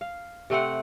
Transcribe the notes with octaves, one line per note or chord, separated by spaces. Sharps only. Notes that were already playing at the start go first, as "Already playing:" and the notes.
F5
C3 A3 C4 F#5